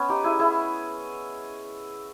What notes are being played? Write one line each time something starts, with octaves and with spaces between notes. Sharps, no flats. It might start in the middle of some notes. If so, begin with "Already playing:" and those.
Already playing: B3 C#4
D#4 G4
E4 G#4
E4 G#4